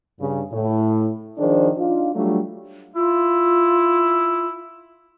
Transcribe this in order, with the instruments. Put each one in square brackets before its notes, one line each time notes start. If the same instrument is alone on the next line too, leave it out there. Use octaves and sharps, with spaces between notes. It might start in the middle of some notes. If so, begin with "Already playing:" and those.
[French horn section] G2 C#3
A2
D#3 F3 D4 G#4 C5
D4 D#4 F4
F#3 G3 A3 D4 F4
[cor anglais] E4 [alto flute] F4